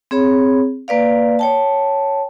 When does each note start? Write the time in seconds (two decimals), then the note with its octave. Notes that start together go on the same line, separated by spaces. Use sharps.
0.11 C4 G#4 C#5 B5
0.88 A#3 B4 D5 F5
1.39 C#5 G5 A5